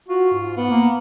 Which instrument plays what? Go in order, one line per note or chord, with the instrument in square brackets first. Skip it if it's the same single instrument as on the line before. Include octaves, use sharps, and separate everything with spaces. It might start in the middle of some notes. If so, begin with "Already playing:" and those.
[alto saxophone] F4 [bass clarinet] F#4
[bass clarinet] G#2
[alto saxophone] B3
[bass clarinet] A#3